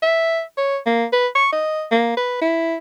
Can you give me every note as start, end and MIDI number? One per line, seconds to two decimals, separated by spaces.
0.02 0.41 76
0.57 0.78 73
0.86 1.05 58
1.13 1.27 71
1.35 1.50 85
1.52 1.85 75
1.91 2.14 58
2.17 2.40 71
2.41 2.77 64